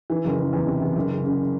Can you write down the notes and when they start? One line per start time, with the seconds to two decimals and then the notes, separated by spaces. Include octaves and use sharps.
0.10 E3
0.25 F#1
0.39 F#1
0.53 E2
0.67 C3
0.81 E2
0.96 F#1
1.11 C#3
1.24 C#3